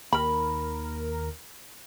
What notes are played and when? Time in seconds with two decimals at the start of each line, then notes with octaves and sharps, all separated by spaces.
0.12 D#2 A#4 B5